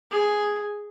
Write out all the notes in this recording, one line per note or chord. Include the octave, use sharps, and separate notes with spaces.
G#4